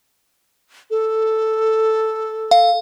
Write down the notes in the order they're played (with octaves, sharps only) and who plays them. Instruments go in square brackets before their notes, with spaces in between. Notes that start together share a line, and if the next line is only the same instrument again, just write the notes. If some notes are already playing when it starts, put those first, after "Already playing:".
[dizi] A4
[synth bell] F5